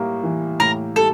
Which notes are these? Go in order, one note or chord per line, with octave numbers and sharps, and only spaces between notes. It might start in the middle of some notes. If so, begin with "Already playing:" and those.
Already playing: A2 G3 A#3
E3
A2 A#4
G3 A4